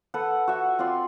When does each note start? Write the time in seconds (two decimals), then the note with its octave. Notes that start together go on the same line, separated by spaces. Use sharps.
0.14 A4 B4 F#5
0.47 F#4 E5
0.79 C4 F4 D5 C6